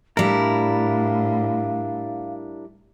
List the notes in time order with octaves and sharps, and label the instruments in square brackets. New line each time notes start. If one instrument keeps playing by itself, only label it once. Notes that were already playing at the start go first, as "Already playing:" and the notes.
[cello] A2 [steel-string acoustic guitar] G3 E4 [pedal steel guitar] D4 A#4 [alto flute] F5